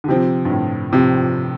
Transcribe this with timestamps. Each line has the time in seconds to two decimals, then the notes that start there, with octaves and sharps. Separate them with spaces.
0.04 D3
0.08 C3 F3 C4 G4
0.45 G2
0.50 A2
0.93 C3 F3 C4 G4